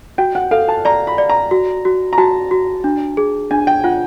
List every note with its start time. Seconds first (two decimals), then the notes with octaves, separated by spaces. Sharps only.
0.18 F#4 G5
0.35 F#5
0.51 A4 F5
0.68 A5
0.85 D5 A#5
1.07 B5
1.18 D5
1.29 A#5
1.51 F#4
1.85 F#4
2.13 A#5
2.18 F#4 A5
2.51 F#4
2.84 D4
3.17 G#4
3.51 D4 G#5
3.67 G5
3.84 F4 F#5